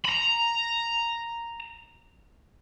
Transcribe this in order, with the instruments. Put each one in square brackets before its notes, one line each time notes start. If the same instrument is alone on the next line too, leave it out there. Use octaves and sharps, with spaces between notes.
[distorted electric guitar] A#5 B5